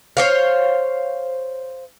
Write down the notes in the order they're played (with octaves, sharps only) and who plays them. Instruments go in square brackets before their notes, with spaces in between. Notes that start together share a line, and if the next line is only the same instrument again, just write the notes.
[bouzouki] C5 C#5 F5